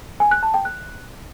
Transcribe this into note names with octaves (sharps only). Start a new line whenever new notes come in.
G#5
F#6
A5
G5
F#6